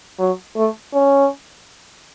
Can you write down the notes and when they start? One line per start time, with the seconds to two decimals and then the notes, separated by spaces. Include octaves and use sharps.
0.19 F#3
0.56 A3
0.93 C#4